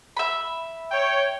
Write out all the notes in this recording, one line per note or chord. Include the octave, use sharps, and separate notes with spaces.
E5 B5
C#5 G5